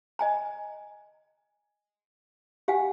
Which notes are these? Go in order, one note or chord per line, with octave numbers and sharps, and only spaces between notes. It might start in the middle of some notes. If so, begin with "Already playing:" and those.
D#5 G#5 A#5
G4 F5 F#5 G#5